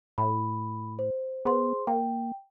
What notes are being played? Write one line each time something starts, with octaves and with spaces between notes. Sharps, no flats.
A2 B5
C5
B3 G#4 C5 C6
A#3 G5